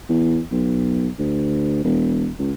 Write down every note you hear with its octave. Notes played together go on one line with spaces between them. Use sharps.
E2
B1
D2
E1
C#2